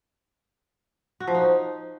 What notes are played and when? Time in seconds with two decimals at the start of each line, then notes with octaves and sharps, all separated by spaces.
1.20 F#4
1.27 F3
1.34 D#4